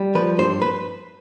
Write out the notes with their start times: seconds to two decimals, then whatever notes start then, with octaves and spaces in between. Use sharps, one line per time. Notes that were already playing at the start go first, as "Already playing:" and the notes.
Already playing: G3
0.15 F3 B4
0.38 G2 C5
0.62 B4